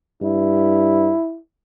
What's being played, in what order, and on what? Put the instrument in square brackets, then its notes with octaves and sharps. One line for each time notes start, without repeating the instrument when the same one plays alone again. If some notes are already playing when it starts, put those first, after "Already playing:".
[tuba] G2 [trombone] E4